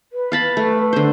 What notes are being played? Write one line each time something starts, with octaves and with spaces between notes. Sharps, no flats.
B4
F5 A5 B5
A3
D3 C5